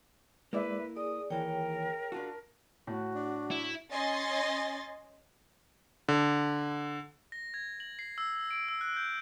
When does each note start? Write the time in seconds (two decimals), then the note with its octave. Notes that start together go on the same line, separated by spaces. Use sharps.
0.53 G#3 A#3 E4 B4 D5 E5
0.97 G#4 D5 D#6
1.30 D#2 E3 A#4 C#5 G5
2.12 D4 F4 F#4 A5
2.87 A2 F#4
3.15 D4
3.51 E4
3.90 C#4 D#5 G#5 C6 A6
6.08 D3
7.32 A#6
7.54 G#6
7.80 F#7
7.99 C7
8.18 E6
8.51 D7
8.68 E6
8.81 F#6
8.96 G6